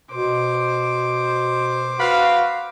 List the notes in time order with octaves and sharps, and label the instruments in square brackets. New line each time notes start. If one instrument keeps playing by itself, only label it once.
[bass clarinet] B2 [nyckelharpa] C5 D6
[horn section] F#4 B4 F5